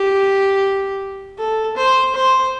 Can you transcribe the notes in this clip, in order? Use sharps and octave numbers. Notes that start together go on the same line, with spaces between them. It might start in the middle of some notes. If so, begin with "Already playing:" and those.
Already playing: G4
A4
C5
C5